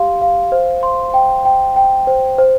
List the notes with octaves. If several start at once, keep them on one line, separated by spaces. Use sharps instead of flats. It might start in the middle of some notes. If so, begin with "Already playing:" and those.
Already playing: G4 F5 C6
F5
C5
C6
G5
G5
G5
C5
C5